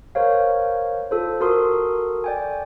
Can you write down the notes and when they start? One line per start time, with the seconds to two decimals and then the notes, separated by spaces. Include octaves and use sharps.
0.15 A#4 C5 C#5 F5
1.11 F4 A4 C5
1.41 F#4 A4 A#4 C6 D#6
2.24 D5 G5 G#5